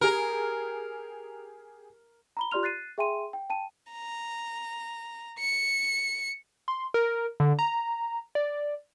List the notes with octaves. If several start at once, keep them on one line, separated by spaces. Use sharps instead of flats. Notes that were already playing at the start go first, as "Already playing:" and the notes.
G4 G#4 A#4
A#5 B5 G7
F4 G4 D5 C6 F6 F7
F#6 A6 C7 D#7
G#4 E5 G5 G#5 C6 D#7
G5
G5 A5 D#7
A#5
C#7
C6
A#4
D3
A#5
D5